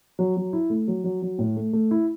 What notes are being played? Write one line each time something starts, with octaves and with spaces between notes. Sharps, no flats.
F#3
F#3
E4
A3
F#3
F#3
F#3
A2
A3
A3
E4